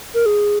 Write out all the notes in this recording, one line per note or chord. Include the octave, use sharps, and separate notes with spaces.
A#4
G#4